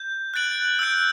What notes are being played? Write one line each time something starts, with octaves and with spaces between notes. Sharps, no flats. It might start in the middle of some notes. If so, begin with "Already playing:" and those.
Already playing: G6
F#6 A6 D7 F#7
E6 G6 D7